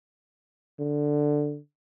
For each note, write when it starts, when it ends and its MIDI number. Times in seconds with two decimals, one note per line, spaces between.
0.79 1.58 50